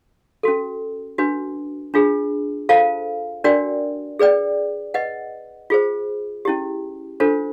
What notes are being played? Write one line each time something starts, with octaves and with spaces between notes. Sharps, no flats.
C#4 F#4 A4
D4 F#4 B4
D4 F4 G#4
F4 A4 C5 F5 A5
D4 F#4 A#4 D5 G5
G#4 B4 D5 G5
B4 D#5 F#5
F4 G#4 C5
C#4 E4 G4
D4 F4 A4 C5